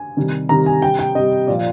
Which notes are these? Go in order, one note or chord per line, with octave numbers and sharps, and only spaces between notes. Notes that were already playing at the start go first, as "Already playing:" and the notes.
Already playing: G#5
C3 D#3 G3
C3 D#3 G3 A#5
G#5
C3 G3 G5
G5
C3 G3 D#5
A#2 F3 D5